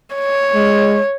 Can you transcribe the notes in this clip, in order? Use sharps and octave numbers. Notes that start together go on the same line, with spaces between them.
C#5
G#3